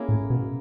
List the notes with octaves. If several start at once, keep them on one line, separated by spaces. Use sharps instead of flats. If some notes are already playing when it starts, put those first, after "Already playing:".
Already playing: A#3 C#4 E4 G#4
A2
B2